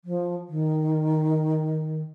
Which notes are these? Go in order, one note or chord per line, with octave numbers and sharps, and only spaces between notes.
F3
D#3